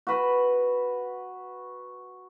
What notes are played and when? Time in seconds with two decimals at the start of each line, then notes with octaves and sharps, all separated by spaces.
0.07 F#4 B4